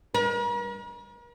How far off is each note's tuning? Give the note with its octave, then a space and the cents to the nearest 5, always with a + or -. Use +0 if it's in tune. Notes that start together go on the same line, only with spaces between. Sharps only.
A#4 +45